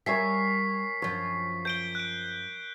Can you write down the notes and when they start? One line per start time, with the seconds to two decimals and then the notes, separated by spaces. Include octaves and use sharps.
0.06 G3 A#4 C#5 E5 G#5 B6 C7
1.02 F#2 F3 C#5
1.65 D6 G6 D7 G7
1.95 F#6 D7